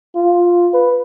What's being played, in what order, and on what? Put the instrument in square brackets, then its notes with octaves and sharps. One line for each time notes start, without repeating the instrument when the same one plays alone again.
[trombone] F4
B4